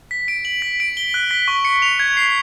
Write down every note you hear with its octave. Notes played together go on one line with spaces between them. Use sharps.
B6
D7
F#7
B6
D7
G7
F#6
B6
C#6
C#7
F7
G#6
C7